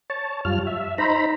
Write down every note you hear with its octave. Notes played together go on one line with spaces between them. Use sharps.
C#5 A5
F#2 G3 F4 F6
E5
D#4 C5 A#5 B5